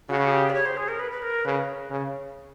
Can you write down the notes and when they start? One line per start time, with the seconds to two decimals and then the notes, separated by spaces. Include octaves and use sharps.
0.09 C#3 F#4
0.27 G#4
0.32 G4
0.50 D5
0.54 C#5
0.66 C5
0.77 G#4
0.88 A#4
0.99 B4
1.12 B4
1.22 A#4
1.45 C#3 B4
1.90 C#3